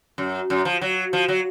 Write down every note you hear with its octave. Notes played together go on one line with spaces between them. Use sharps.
F#2
F#2
F3
F#3
F3
F#3